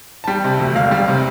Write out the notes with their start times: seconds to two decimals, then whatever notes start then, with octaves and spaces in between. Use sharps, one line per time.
0.24 A5
0.28 G3 G5
0.44 C3
0.60 D2
0.75 E1 F5
0.91 G3
1.08 C3